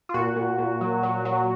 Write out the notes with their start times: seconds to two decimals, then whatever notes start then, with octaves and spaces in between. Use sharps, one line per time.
0.09 F4
0.14 A#2 F#4
0.36 A#2
0.58 A#2
0.81 F#3
1.03 F#3
1.25 F#3